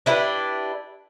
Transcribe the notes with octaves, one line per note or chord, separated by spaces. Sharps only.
D4 E4 G4 B4